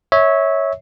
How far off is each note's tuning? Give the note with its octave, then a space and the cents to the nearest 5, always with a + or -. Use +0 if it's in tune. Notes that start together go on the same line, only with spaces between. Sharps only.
C#5 -5 E5 -25